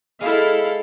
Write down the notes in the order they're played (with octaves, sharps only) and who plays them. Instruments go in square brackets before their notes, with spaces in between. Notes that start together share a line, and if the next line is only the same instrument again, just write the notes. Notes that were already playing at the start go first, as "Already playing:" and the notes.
[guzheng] G#3 [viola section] E4 A4 F5